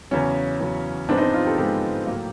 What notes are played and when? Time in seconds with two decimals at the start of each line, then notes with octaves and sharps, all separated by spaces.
0.11 E2 C#3 F#3 C#4
0.60 E2 C#3 F#3
1.09 G#2 F3 G#3 B3 C4 D4
1.17 D#4
1.21 C4 D4
1.33 D#4 F4
1.45 G4 A4
1.58 G#2 F3 G#3 B3 G4 A4
2.07 A2 F#3 A#3